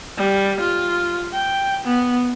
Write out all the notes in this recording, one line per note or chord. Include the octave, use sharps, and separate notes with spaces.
G3
F4
G5
B3